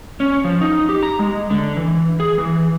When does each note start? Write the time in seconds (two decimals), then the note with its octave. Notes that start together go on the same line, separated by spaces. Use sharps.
0.20 C#4
0.44 F3
0.61 D#4
0.89 G4
1.03 A#5
1.19 G#3
1.50 D3
1.77 E3
2.20 G#4
2.38 E3